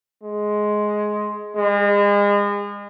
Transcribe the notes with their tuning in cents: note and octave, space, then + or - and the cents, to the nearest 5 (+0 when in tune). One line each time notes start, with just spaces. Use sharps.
G#3 +10
G#3 -35